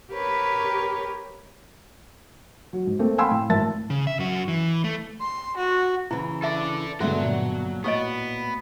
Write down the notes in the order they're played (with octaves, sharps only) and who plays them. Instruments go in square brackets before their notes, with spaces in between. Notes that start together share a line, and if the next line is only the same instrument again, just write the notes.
[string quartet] G4 A#4 B4 C#5
[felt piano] F#3
G#2
A3 A#3 C4 A4
F5 G5 G#5 B5 C6 E6
A2
G#1 A2 A#4 E5 A5 A6
[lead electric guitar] C#3
E5
F#2 F#4
E3
A3
[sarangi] C6
F#4
[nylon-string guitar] C#3 E3 [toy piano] E4
[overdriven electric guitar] A4 D5 [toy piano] E5
[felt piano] G2 B2 D3 [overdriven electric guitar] F#3 F#5 [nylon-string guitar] G#3 A3
[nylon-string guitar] A#2
[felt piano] A2 F#4 D7 [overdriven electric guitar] B3 [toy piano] G4 C#5 D#5